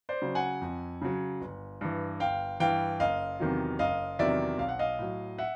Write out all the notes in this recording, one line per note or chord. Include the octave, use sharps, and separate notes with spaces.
C5 D5
C#3 F#3
F#5 G#5
F2
C#3 F#3
G1
G2 E3
G1 F5 G5
G2 E3 F5 G5
F#1 D#5 F5
E2 C3 D#3 F#3
F#1 D#5 F5
E2 C3 D#3 F#3 D5 E5
B1 F5
F#5
D#5 F5
A2 F#3
E5 F#5